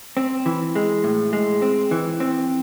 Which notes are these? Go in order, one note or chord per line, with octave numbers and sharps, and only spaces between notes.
C4
E3
G#3
A2
G#3
C4
E3
C4